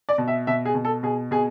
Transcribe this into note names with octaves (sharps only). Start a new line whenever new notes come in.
D5
B2
E5
B2 E5
G#4
B2
A4
B2 G#4
B2 G#4